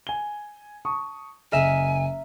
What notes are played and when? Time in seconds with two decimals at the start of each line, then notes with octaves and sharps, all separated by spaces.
0.07 G#5 G7
0.85 A5 C#6 D#6
1.52 F#1 A#4 D#5 E5 G#5